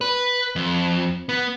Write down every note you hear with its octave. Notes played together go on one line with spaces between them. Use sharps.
B4
F2
B3